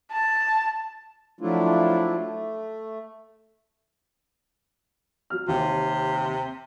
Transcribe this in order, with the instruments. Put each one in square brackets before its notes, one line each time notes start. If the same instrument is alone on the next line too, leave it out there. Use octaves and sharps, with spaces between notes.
[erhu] A5
[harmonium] F3 F#3 A3 D4 E4 F4
A3
[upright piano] F#3 F6
[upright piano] D#2 [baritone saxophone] C3